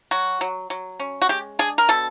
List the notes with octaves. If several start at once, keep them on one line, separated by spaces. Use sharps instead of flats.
F#3 F#4
F#3
F#3
C#4
F#4
G#3 G4
D4 G#4
A#4
B2 A4